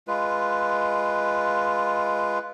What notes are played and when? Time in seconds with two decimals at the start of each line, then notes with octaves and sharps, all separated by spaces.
0.08 G#3 F4 B4